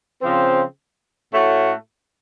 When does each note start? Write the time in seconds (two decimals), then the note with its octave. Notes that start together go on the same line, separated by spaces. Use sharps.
0.22 C#3 F3 C4
1.32 A2 A3 C#4 F#4